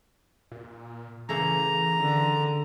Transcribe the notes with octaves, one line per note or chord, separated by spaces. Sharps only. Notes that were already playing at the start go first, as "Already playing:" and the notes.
A#2
C#3 E3 A3 A#3 A#5
D3